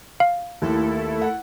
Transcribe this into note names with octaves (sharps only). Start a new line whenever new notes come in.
F5
D#2 A3 E4 A4
F#5